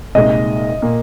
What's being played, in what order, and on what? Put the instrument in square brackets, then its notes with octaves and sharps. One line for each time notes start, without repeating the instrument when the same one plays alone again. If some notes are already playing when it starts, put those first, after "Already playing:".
[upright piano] C2 A#2 G#3 D#4 G#4 [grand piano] D#5
[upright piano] A#2 A#3